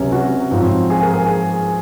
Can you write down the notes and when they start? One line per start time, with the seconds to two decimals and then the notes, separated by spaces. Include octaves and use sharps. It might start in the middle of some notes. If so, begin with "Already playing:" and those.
Already playing: C#2 C3 F#3 C#4 C#5
0.12 F#4
0.51 G#2 F3 C4
0.90 G#4
1.03 A#4
1.14 G#4